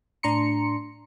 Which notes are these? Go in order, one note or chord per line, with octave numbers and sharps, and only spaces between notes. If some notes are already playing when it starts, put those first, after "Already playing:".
A2 D4 A#5 C6 C#7